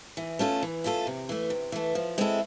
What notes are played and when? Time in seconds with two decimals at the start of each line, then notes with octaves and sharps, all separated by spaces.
0.17 E3
0.39 A3 C#4 F4 A4
0.62 E3
0.84 A3 C#4 F4 A4
1.07 C3
1.29 E3 A3
1.50 C3
1.72 E3 A3
1.95 F3
2.18 G#3 C4 E4 A4